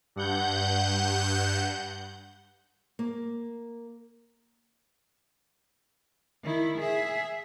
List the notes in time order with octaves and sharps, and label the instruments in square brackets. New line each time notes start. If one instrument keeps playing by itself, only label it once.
[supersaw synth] G2 F#5 G6
[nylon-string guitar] A#3
[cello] D#3 E4
G#4 E5